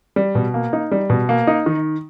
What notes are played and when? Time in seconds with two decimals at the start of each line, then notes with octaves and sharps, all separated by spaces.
0.16 G3
0.35 B2
0.54 A#3
0.73 D#4
0.92 G3
1.10 B2
1.29 A#3
1.47 D#4
1.66 D#3